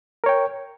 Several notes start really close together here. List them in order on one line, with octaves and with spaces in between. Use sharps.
A#4 C#5 G5